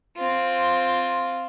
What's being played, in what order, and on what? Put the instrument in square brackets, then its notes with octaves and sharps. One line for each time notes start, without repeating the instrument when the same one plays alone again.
[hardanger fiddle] C4 F4